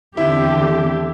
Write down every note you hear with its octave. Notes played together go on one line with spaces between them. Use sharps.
E2 D3 A3 C4 E4 G4